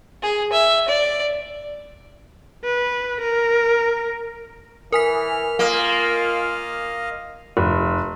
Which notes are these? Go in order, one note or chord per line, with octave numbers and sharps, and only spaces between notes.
G#4
E5
D5
B4
A#4
E3 A#4 G#5 F6 B6
A#3 F4 D#5 F5
F1